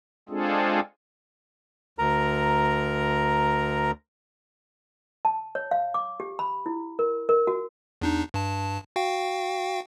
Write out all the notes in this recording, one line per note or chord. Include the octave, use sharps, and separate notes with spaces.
G#3 C4 D4 F4 G#4 A4
D2 A#4 A#5
A5
C#5
F5
D6
G4
B5
E4
A#4
A#4
F#4
E2 D4 D#4
G2 A5
F#4 F5 G5